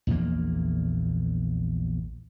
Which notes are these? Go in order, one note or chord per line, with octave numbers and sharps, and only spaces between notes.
A#1 E2 A#2 A#3